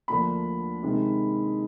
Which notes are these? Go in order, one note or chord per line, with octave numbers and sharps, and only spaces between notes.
D2 D3 F3 A#3 D4 B5
C3 D#3 G#3